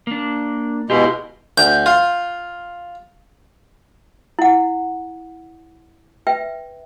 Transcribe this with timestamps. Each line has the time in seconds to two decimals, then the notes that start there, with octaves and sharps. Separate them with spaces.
0.07 A#3 D4
0.90 B2 G#3 E4 F4 G4
1.58 D2 G6
1.86 F4
4.39 E4 F#5
6.27 B4 E5 G5